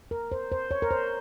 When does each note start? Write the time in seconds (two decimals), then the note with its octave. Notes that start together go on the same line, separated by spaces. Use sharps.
0.11 A#4
0.32 C5
0.52 C5
0.71 C#5
0.82 A#4
0.91 C5